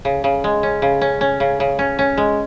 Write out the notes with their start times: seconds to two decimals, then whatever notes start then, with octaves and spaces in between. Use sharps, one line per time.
0.05 C#3
0.24 C#3
0.44 G#3
0.63 C#4
0.82 C#3
1.01 C#4
1.21 C#4
1.40 C#3
1.60 C#3
1.79 C#4
1.99 C#4
2.17 G#3